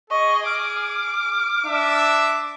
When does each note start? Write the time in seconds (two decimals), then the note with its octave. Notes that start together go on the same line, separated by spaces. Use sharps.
0.10 G#4 D#5 C#6
0.46 D6 F6
1.66 D4 E5